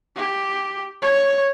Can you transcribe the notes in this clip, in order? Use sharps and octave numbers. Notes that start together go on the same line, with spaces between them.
G4
C#5